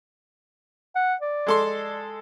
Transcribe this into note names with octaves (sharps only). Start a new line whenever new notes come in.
F#5
D5
G#3 A4 C6
D5